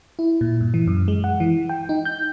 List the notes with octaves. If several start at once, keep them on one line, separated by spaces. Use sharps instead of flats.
E4
A#2
G2
E3
F#2
G#3
F#5
E3
G5
D#4
G6